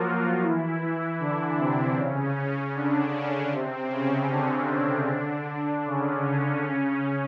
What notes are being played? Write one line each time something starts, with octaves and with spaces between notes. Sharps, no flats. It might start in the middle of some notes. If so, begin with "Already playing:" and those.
Already playing: F3 F#3 A#3 F4 F#4 A#4
E3 E4
E3 E4
D3 D4
C3 C4
C#3 C#4
D3 D4
C#3 C#4
C3 C4
C#3 C#4
D3 D4
D3 D4
C#3 C#4
C#3 C#4
C#3 C#4